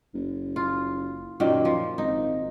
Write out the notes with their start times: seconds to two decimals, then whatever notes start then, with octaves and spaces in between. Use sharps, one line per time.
0.14 F#1
0.56 F4
1.40 F#2 A#2 D#3 A#3
1.65 F3
1.98 G#1 D#4